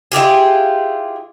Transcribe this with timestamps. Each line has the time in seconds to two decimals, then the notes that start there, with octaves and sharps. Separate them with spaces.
0.12 E4 F4 G4 G#4